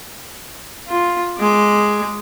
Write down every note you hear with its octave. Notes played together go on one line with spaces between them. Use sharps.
F4
G#3 D6